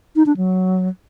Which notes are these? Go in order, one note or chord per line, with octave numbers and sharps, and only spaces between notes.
D#4
D4
F#3